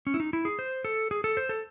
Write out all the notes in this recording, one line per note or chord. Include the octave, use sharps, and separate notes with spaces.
C#4
E4
D#4
E4
G#4
C5
A4
G#4
A4
C5
A4